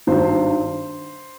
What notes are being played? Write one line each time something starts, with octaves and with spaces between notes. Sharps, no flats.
G#1 G2 D#3 C5